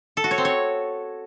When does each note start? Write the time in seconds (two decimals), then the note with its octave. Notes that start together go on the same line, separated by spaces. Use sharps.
0.17 A4
0.24 F#4
0.31 C#5
0.38 C4
0.45 C#5